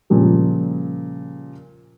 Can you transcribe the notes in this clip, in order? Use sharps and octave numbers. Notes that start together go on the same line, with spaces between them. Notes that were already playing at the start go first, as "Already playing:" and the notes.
A#2 C#3 F3 G3